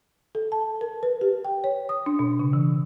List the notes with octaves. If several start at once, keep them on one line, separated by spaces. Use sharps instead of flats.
A4
A5
A#4
B4
G4
G5
C#5
D#6
D4
B2
C#3
E3